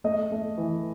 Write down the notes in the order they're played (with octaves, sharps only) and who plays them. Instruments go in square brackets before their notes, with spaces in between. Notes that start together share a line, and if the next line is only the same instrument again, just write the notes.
[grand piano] A3 D#5
A3
E3